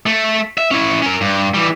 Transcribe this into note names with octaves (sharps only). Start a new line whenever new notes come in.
A3
E5
C#4 E4
C#4 A#4
G2
E3 G3